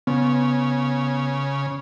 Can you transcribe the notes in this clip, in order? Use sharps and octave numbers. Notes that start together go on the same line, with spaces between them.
C#3 B3